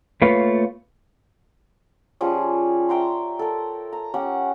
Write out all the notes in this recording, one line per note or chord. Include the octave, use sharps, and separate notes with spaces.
A3 A#3 F4 B4 C#5 F5
F3 G3 C#4 G#4
E5 G5 A#5 C6
A4 A#4
A#5
C#4 G4 F#5